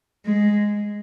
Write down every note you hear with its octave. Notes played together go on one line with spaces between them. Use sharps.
G#3